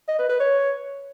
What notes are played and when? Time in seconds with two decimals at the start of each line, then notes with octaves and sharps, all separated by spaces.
0.08 D#5
0.19 B4
0.29 B4
0.40 C#5